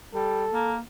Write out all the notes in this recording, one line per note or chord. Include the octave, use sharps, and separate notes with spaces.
G3 A4
A#3